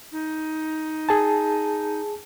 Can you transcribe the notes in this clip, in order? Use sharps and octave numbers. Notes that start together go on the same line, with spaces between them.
D#4
G#4 A5